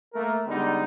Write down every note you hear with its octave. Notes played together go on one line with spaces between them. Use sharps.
A3 A#3 A#4
D3 G3 G#3 B3 D#4